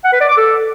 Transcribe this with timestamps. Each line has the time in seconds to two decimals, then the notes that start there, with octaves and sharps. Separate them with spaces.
0.04 F#5
0.13 B4
0.21 D5
0.29 D6
0.37 A4